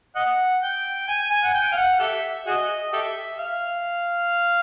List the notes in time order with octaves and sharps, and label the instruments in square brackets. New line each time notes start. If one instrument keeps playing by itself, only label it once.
[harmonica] D#5 F#5
G5
G#5
G#5
F#5
G5
F5
F#5
G4 A4 E5
F#4 G#4 D#5
G4 A4 E5
F5